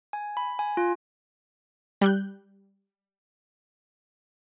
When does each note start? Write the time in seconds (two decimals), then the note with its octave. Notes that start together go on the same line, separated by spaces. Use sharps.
0.13 G#5
0.37 B5
0.59 G#5
0.77 F4
2.01 G3 F#6 G6